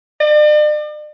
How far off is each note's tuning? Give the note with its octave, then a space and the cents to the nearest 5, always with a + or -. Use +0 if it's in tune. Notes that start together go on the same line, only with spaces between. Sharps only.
D5 +40